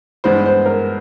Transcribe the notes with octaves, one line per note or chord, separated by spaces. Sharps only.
G2 E3 G#3 B3 C5
C5
A#4